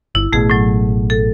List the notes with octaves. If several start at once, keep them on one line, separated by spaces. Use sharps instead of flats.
G1 E4
A1 B2 A3 G#4
A2 F#3
A4